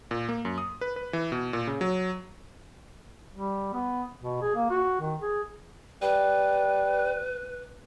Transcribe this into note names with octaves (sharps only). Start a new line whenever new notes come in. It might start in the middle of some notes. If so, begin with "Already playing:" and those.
A#2
A#3
F#2
D#6
B4
B4
E3
B2
A#2
C#3
F#3
G3
B3
B2
G#4
A#3
F#4
D#3
G#4
G3 B4